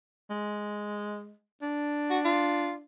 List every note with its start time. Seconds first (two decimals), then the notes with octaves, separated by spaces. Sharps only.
0.30 G#3
1.62 D4
2.10 F#4
2.25 F4